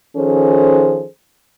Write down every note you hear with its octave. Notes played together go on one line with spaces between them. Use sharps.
D#3 F3 C#4 G#4 A4 C5